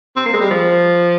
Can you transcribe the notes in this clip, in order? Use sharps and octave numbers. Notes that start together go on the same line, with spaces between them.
C4
A#3
G#3
G3
F3